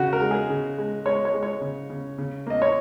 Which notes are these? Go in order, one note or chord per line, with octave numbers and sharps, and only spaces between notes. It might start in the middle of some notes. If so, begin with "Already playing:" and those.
Already playing: C#3 F#4
A#4
G#3
G#4
C#3
G#3
G#3 C#5
C#5
G#3
C#5
C#3
C#3
C#3
A#3 D#5
C#5